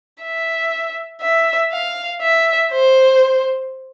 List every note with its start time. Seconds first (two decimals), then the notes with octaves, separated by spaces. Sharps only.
0.22 E5
1.21 E5
1.72 F5
2.21 E5
2.72 C5